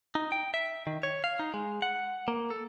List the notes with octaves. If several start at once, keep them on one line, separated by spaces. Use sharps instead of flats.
D#4
G5
E5
D#3
C#5
F5
D#4
G#3
F#5
A#3
A4